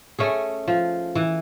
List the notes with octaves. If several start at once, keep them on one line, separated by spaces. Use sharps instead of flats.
A3 C#4 G#4
F3
E3